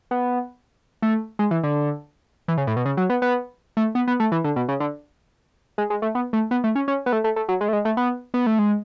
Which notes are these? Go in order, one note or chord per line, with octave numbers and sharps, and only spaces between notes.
B3
A3
G#3
E3
D3
E3
C#3
A2
B2
C#3
F#3
B3
B3
A3
B3
B3
A3
E3
D3
B2
C#3
D3
G#3
G#3
A3
B3
A3
B3
A3
C#4
C#4
B3
A3
A3
A3
F#3
G#3
A3
G#3
A3
B3
B3
A3
G#3